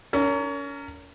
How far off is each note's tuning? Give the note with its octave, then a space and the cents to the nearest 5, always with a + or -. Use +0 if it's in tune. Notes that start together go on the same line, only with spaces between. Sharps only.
C#4 +30 A#4 -15